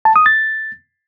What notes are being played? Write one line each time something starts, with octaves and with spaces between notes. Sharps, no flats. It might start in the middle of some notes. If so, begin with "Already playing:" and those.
A5
D#6
A6